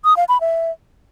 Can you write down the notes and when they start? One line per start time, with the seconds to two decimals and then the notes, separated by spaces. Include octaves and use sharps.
0.05 D#6
0.17 F5
0.29 B5
0.41 E5